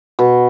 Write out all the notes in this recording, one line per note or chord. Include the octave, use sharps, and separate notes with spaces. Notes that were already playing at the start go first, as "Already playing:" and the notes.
B2